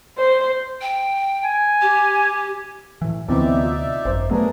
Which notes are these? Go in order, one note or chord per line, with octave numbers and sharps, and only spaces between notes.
C5
G5
G#5
G4
A2 E3
D2 C3 E3 B3 C4 D#4 D5 E5
F4
G#1 F#2 C5
F#3 A3 B3 D4 G#4 A#4 B4